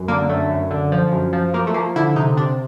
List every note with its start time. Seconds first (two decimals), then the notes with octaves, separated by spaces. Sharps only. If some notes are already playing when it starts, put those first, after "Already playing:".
Already playing: F#2
0.08 D3 A#3
0.29 F#2 A3
0.50 F#2
0.71 D3
0.92 F3
1.12 F#2
1.33 F3
1.54 F3 A#3
1.67 A3
1.74 F3 A#3
1.96 D3 E4
2.16 C3 D#4
2.37 C3 D4